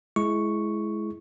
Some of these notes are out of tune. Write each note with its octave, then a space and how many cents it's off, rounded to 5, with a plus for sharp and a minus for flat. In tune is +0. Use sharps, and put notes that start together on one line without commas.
G#3 +25 E4 +10 C#6 +0